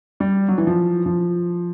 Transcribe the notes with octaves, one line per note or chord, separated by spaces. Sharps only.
G3
F#3
E3
F3
F3